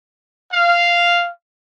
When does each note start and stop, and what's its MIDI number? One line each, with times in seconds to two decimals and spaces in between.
0.53 1.28 77